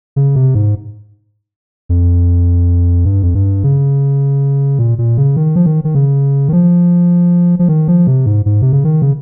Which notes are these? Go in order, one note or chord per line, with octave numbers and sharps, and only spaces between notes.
C#3
C3
G#2
F2
G2
F2
G2
C#3
A#2
A#2
C#3
D#3
F3
D#3
D#3
C#3
D#3
F3
F3
D#3
F3
C3
G#2
G#2
C3
C#3
D#3
C#3